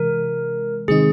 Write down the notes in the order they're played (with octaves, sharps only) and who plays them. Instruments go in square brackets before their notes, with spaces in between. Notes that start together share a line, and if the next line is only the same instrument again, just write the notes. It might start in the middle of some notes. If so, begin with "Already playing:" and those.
Already playing: [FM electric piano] C3 E3 G#3 [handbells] A#4
[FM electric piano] C3 D#3 G#3 C4 D#4 [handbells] G#4